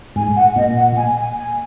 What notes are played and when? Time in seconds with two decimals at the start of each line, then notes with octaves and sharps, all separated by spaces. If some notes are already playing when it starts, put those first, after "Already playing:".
0.16 G#2 G#5
0.36 F#5
0.56 A#2 D#5
0.76 F#5
0.96 G#5
1.17 G#5
1.36 G#5